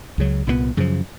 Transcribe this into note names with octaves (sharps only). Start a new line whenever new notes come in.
C#2 C#3 F#3
C2 A#2 G3 B3
F#2 C#3 F3